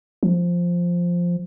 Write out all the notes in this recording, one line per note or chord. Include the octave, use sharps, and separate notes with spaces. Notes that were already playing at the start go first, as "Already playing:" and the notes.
F3